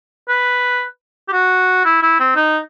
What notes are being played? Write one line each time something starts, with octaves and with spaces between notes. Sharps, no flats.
B4
G4
F#4
E4
E4
C4
D#4